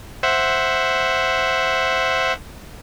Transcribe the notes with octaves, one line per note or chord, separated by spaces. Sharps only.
C5 E5 F#5